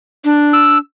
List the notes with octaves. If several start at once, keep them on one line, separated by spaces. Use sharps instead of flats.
D4
E6